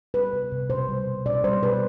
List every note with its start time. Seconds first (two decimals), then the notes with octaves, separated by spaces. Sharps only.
0.14 G3 B4
0.33 C3
0.52 C3
0.70 B2 C5
0.89 G3
1.07 B2
1.26 B2 D5
1.44 G3 C5
1.62 B2 B4